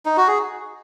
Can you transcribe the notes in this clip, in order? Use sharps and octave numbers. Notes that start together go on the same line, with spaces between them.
D#4
F#4
G#4